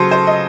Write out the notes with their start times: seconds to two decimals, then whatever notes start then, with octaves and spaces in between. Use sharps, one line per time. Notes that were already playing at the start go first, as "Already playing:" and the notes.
Already playing: C#3 F#3 A4 C5
0.11 C5
0.27 D#5